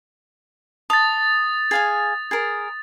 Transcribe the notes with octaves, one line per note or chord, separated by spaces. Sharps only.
A5 D#6 A6
G#4 F5 G#5
G#4 A#4